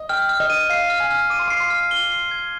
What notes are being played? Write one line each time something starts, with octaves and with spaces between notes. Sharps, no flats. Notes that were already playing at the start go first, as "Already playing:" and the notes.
Already playing: D#5
G5 F6
F6
D#5
D#7
F5 C7
F6
G#5
F6
D6 D#7
C6
D6
C7
C6
F6
G7
C7
G#6